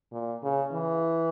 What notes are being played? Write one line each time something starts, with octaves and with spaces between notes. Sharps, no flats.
A#2
C#3
E3